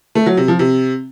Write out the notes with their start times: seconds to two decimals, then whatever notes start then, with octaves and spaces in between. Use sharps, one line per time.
0.15 A3
0.26 F#3
0.37 C3
0.48 F3
0.59 C3